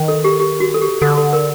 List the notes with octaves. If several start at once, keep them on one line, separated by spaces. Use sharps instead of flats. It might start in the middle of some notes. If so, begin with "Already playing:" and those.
Already playing: D#3
A4
G4
G4
F#4
A4
G4
D3 A4
A4
A#4